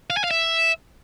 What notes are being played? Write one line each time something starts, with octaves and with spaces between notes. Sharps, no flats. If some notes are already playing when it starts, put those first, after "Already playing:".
F5
G#5
F5
E5